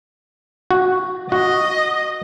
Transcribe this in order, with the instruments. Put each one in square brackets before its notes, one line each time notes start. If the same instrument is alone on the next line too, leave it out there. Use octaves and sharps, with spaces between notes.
[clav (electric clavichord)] F#4
[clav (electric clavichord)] F#4 [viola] D#5